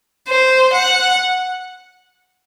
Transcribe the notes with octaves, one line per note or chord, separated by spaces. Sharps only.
C5
F#5